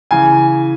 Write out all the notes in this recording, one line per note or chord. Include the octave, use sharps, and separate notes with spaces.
C#3 E3 G#5